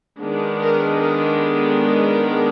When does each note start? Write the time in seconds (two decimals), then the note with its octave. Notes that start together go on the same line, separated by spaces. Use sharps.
0.20 D#3 G#3 B3 D4
0.61 A#4
1.00 A#4
1.41 A4
1.83 A#4